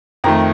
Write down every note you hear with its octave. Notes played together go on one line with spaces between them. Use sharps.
F2 D#3 A3 A#5